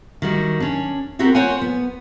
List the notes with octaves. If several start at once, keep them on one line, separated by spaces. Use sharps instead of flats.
D#3 G3 F#4
C#4 D4
B3 C4 F#4 G4 A#4 C5
F4 C5 C#5 F#5 G#5
B3